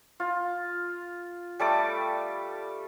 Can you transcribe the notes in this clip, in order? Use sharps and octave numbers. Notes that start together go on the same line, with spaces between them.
F4
G3 A3 A5 D6